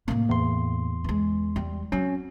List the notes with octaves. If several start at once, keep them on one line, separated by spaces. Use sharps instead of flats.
A2 A#3
E2 C6
E3 G#3
G3
F#3 C4 C#4